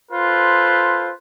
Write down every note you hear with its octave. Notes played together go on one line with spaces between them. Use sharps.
F4 A4 B4 C5